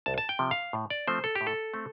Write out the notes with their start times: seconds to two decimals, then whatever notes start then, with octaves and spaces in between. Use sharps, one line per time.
0.06 C2 A5
0.18 A5
0.29 G5
0.39 C3 F3
0.51 F5
0.73 A2
0.90 D5
1.07 F3 A3 C4 C5
1.24 A4
1.35 G4
1.41 A2
1.47 A4
1.74 A3 C4